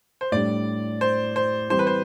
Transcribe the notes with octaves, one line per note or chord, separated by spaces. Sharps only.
C5
A2 G3 D4 D5
C5
C5
E3 G3 C4 C5
B4
C5